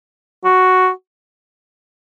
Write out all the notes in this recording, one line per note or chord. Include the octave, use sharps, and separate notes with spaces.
F#4